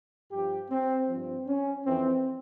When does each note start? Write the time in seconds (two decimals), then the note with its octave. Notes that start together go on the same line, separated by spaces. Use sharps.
0.32 G2 F3 G4
0.70 C4
1.09 G2 F3 C4
1.47 C#4
1.86 F2 E3 C4